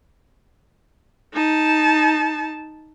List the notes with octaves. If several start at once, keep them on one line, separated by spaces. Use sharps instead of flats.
D#4 A5